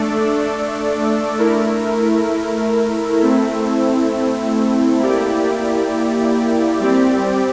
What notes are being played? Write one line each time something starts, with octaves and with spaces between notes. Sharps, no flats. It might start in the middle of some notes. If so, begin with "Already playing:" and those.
Already playing: A3 D4 A4 D5
A3 E4 A#4
A3 C4 E4 A4
A#3 E4 G4 D5
G3 C4 G4 D5